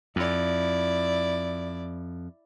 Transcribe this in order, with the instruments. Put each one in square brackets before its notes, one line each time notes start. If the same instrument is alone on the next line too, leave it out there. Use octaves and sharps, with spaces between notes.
[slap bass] F2 [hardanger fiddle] E4 D5